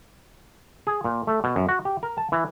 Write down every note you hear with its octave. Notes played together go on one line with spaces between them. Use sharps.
G#4
A#2
A3
B2
F#2
F#4
G4
A#4
A5
E3